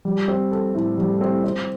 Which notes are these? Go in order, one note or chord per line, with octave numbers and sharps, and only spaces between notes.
G3
C4
A4
A2
G3
C4
C4